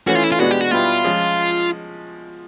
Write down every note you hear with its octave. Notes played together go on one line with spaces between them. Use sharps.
E3 A3 C#4 F#4
F4
E4
F4
B2 G#3 B3 D4 F#4
G4
F#4
B2 G3 B3 E4 F4 G4
F3 G#3 C#4